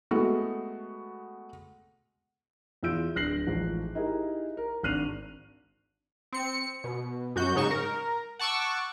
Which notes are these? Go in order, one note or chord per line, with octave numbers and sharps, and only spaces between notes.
G#3 A3 B3 F#4
E2 E4 F4 E6 G6 D7
D1 D4 F#6 A#6 C7 F#7
A1 G#2 F3
D#4 E4 G4 G#4 A#4
A#4
G#1 D4 F#6 C7 D#7 F7
C4 C#7
B2
F#2 F#4 G6
G#2 C#3 D#4 C#6 E7
A#4
F#5 A5 C#6 D6 E6